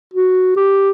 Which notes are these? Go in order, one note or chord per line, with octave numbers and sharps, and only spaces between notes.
F#4
G4